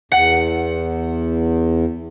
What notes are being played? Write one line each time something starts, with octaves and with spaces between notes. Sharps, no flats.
E2 F#5